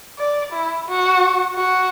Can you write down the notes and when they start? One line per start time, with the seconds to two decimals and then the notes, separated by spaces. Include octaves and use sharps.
0.18 D5
0.53 E4
0.88 F#4
1.56 F#4